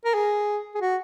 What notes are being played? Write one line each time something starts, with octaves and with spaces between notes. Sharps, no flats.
A#4
G#4
G#4
F#4